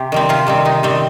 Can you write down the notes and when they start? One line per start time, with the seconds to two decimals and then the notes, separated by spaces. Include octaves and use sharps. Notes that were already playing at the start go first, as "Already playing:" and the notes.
Already playing: C3 G4
0.12 D#3 G3 C4
0.29 C3 F4
0.47 D#3 G3 C4
0.65 C3 D#4
0.83 D#3 G3 C4